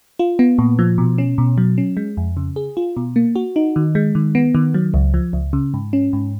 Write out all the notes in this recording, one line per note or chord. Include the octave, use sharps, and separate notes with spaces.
F4
B3
A#2
F3
B2
C#4
B2
F#3
C#4
G#3
F2
C#3
G#4
F4
B2
A#3
F#4
D#4
D#3
G#3
D#3
B3
D#3
F#3
C#2
F3
C#2
C#3
G#2
C#4
G#2